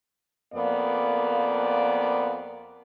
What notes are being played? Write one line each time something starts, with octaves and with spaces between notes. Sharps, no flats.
F2 A#3 B3 D5